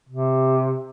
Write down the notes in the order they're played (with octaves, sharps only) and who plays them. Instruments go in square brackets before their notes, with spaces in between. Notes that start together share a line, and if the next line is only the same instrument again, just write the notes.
[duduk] C3